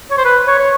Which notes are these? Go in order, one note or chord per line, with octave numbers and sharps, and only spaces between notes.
C#5
C5
B4
C#5
C#5